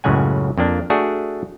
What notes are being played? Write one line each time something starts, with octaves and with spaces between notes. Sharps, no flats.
C#2 F#2 A2 C#3 F#5 G#5
F2 A#3 D4
A3 D4 F#4 G#4